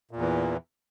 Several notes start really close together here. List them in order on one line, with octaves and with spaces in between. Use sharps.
A#2 E2 E3